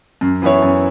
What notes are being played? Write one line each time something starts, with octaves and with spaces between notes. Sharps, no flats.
F#2
E3 B3 E4 C#5
F#2